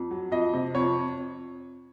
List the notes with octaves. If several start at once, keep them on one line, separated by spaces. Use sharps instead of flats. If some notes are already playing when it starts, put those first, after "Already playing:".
Already playing: F2
F#3
F2 D#5
C3
F2 C#5